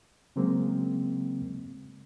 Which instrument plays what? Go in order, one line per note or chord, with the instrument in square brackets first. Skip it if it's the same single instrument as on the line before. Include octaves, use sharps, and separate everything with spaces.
[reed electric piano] C#3 F#3 G#3 A#3 C4